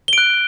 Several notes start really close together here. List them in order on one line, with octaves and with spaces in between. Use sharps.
G7 D7 F#6